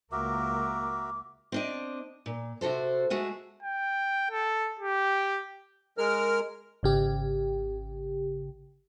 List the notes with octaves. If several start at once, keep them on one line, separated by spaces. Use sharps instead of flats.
C#2 A#3 F#4 A#4 E5 D6
C4 D4 D#5
A#2
C3 F#4 A4 C5
G#3 A3 F#4 G#4
G5
A4
G4
G#3 A#4 F6
G#1 C#3 G4